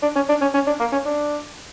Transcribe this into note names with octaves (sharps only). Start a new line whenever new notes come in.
D4
C#4
D4
C#4
C#4
D4
A#3
C#4
D4